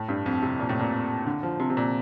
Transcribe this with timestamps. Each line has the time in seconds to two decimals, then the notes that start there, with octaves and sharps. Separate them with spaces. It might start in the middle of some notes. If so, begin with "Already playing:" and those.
Already playing: A2
0.09 G2
0.26 F2
0.42 C3
0.59 A#2
0.69 A2
0.79 A#2
1.26 D3
1.43 F3
1.59 C3
1.70 C3
1.77 A#2